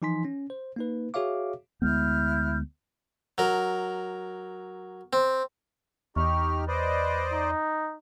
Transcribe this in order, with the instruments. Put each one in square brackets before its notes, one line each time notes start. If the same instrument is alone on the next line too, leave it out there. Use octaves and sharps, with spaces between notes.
[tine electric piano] E3 F3 D#4 G#5 C6 B6
C#4
C5
A#3 D#4 B4
F#4 G#4 C#5 E5 F5 D6
[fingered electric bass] D2 G#3 B3 [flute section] E4 F6 G6
[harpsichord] F#3 A#4
C4
[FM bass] E2 [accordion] D#4 G4 F6 [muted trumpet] C#6
[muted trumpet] B4 [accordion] C5 D5 D#5
[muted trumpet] D#4